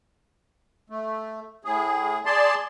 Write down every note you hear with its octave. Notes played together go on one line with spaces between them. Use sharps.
A3
A2 G#4
G#4 D5 A5 C6